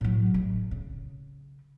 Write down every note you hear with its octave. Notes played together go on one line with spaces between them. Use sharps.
A2 F#3
A1
C#3